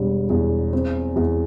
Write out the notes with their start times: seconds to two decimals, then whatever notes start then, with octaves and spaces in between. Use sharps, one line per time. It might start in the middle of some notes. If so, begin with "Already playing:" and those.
Already playing: E1 G3
0.30 E2
0.73 C4
1.16 E2